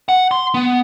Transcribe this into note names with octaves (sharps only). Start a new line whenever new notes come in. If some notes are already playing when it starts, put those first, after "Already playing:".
F#5
C6
B3